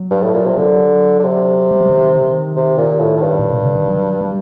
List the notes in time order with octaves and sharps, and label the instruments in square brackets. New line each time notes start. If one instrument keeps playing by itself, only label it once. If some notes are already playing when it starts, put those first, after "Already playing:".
Already playing: [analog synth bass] F#3
[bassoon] G2
A2
A#2
C3
[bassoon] D3 [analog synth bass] F#3
[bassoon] D3
C3
[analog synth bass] G3
F#3
D#3
D3
D#3
[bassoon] C3
A#2
A2
A2
G2
[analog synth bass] A#2
C3
D3
D#3
F#3
G3